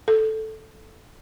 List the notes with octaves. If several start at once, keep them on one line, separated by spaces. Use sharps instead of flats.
A4